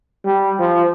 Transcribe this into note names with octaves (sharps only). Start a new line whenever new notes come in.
G3
F3